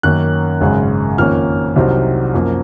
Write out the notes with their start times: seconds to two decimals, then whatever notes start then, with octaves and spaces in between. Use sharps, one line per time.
0.03 F#2 D#3 A#3 C#4 F#6
0.61 G#1 F#2 C#3 G#3
1.18 F2 D#3 A#3 C#4 F6
1.76 C2 C3 F#3 C4 D#4
2.34 F#2 F3 A#3